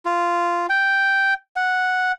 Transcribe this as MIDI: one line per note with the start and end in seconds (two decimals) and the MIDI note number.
0.06 0.66 65
0.69 1.34 79
1.56 2.12 78